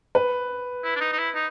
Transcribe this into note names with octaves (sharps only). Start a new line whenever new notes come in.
B4
E4
D4
D#4
D#4
E4
D#4